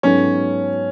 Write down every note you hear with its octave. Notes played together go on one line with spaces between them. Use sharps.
G#2 F#3 B3 C#4 D#4 A4